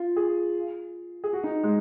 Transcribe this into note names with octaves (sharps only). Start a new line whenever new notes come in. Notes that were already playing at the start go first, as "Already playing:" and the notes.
Already playing: F4
G#4
G#4
F#4
D#4
G#3